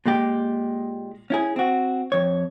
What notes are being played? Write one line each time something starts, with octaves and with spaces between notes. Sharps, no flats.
A#2 G#3 G4
C#4 E4 G#4
C4 F#4
F2 C#5